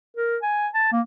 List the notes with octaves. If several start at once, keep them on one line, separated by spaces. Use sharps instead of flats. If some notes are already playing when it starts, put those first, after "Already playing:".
A#4
G#5
A5
A#3